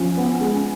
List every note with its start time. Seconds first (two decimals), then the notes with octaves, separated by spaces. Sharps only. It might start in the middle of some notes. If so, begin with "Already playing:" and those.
Already playing: F3 C#4
0.17 B3
0.40 G#3